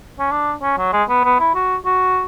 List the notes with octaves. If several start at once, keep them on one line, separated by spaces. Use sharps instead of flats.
C#4
D4
C#4
F#3
G#3
B3
B3
E4
F#4
F#4